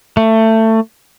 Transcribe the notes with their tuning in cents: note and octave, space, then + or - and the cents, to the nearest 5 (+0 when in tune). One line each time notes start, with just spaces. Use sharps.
A3 +20